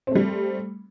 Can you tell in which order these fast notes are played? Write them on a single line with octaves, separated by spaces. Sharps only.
C4 A3 G3